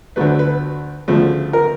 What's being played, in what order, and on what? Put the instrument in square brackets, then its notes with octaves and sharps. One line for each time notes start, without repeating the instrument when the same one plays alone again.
[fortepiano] D2 D3 F#3 A3 B4
B4
D2 C#3 F3 A3
A#4